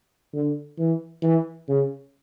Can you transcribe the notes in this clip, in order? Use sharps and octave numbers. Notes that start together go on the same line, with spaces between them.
D3
E3
E3
C#3